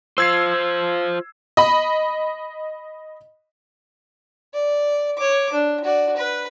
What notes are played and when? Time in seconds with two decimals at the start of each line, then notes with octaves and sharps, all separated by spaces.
0.18 F4 C5 E6 G#6 C7
1.57 D#5 B5
4.54 D5
5.17 C#5 D6
5.53 D4
5.84 F#4 D5
6.17 B4